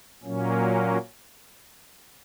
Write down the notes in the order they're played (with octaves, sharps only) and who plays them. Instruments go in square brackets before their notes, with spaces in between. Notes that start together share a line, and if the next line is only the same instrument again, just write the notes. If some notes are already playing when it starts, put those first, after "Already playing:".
[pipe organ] A#2 F#3 A#3 C#4